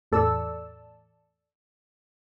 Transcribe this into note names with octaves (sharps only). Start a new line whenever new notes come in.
E2 A2 A4 D5 A5 E6